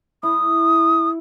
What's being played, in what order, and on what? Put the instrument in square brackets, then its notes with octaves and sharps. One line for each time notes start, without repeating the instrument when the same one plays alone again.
[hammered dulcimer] E4 [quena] D#6